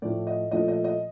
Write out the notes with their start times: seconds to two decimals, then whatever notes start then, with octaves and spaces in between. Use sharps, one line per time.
0.02 A2 F3 A3 D5
0.27 D#5
0.51 A#2 F3 A3 D#5
0.68 D#5
0.84 D#5